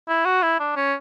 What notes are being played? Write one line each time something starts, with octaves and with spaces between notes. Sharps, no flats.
E4
F#4
E4
D4
C#4